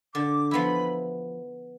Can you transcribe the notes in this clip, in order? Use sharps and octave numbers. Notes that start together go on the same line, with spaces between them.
D3 D6
F3 B3 E4 B5